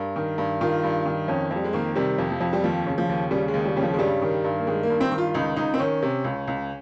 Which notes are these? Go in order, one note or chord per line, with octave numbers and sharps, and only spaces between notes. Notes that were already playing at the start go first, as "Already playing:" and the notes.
Already playing: G2 A#4
D#3
G2
D#3 F4
G2
D#3
F2 C#4
F2
G3
G#3
D#3 A#3
C3 G3
F2
F3
F2
G3
D#2 F3
C#3
F3
D#2
C#3 G3
G#3
D#2
G3
C#3 G3
F3
G#3
G2 G3
D#3
G2
A#3
D#3 G#3
A#3
G2
C4
D#3
F4
C#2 D#4
C#2 D#4
C4
D#3 C#4
C3
C#2
C#2